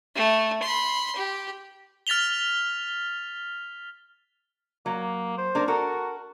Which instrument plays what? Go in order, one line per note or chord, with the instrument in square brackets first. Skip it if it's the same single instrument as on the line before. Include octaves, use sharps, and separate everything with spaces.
[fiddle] A3
B5 C6
G4
[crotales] F6 A6 B6 F7 G7
[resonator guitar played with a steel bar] F#3 [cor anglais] A#3
[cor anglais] C5
[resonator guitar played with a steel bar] A#3 D4 A#4
[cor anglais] F#4 [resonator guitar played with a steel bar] A4 A#4